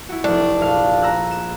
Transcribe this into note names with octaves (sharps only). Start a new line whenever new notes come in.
E4 F#4
F1 A3 D4
A#1 F5
A#5 E6 F#6
E7